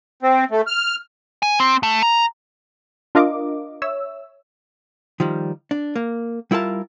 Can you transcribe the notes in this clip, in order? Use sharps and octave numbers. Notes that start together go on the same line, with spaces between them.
C4
A3
F6
G#5
C4
A3
A#5
D4 F4 A#4 D#5 F5 D6
C#5 E5 E6
D#3 F3 G3
D4
A#3
G3 E4 F4 A#4 A5